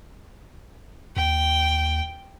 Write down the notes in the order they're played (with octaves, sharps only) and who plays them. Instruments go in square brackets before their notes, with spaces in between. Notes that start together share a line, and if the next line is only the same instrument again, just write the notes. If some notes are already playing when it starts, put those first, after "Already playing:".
[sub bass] D#2 [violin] G5